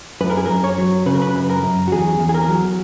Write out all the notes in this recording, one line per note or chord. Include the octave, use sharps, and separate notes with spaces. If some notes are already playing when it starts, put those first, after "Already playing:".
F#2 B4
A#4
G#4
F#2 A#4
C#5
F#3
C#3 B4
A#4
B4
F#2
A#4
F#2
F#4
E2 G#4
E2
G#4
A#4
F#3